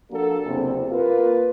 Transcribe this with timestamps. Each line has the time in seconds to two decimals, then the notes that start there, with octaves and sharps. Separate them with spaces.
0.11 F3 A#3 D4 F#4 A4
0.45 F#1 E2 C3
0.90 A#3 F4 A#4 B4